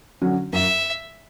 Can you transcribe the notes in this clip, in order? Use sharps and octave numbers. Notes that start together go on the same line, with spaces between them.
D3 F#3 C#4 F#4
F#2 E5